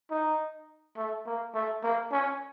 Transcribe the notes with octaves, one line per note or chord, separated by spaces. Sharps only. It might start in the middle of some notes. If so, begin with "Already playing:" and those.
D#4
A3
A#3
A3
A#3
C#4